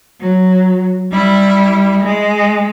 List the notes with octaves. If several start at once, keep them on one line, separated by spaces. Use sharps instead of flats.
F#3
G3 E4
G#3